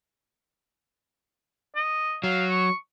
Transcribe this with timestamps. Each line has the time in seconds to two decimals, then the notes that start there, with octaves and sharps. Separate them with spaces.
1.75 D#5
2.24 F#3 F5
2.50 C#6